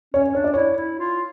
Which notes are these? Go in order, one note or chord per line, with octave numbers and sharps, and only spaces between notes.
C#4 C#5
D4 C#5
D5
E4 C#5
E4
F4